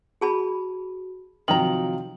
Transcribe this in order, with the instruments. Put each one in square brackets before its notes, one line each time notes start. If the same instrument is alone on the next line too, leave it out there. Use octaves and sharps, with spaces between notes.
[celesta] F#4 [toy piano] G#4 A5 B5
[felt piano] C3 F3 F#3 [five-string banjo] D#3 A#5 [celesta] F#7